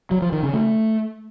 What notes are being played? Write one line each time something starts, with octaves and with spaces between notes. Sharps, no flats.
F#3
F3
D#3
C#3
A3